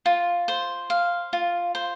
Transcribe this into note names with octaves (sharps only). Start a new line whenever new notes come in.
F4
C5
F5
F4
C5